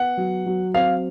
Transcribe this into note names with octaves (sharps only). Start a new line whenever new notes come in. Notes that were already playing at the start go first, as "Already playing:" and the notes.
Already playing: B3 F#5
F#3
F#3
C4 F5